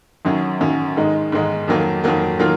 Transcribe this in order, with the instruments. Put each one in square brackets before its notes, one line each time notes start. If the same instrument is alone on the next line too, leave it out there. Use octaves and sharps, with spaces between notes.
[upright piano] F#2 D#3 F#3 C#4
F#2 D#3 F#3 C#4
G#2 D#3 G#3 D#4
G#2 D#3 G#3 D#4
F2 D#3 F#3 A#3
F2 D#3 F#3 A#3
D#3 F#3 A#3 F4